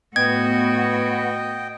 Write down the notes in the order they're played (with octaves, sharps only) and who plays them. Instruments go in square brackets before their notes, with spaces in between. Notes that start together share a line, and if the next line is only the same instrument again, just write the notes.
[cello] A2 F#4 [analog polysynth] B3 [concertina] D#5 G5 [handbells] G#6